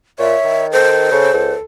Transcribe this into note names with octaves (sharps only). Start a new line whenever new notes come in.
A#2 C#5 E5
D#3
A4 C5
C#3 A4
C#2 A4